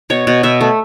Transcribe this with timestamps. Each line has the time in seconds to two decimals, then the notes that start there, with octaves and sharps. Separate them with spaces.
0.10 B2 C#5
0.27 B2
0.43 B2 E5
0.61 A3